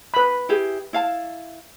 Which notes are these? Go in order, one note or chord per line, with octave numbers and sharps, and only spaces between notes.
B4 B5
E4 G4 G#4
E4 F5 A5